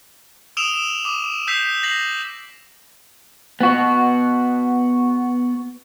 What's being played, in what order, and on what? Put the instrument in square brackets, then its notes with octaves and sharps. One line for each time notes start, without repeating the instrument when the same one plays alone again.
[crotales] D#6 E6 D7 E7 F7 G7
D7 E7
D6 D#6
E6 G6 B6 C7 F7
G6 A#6 C7 F#7
[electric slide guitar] B3 F#4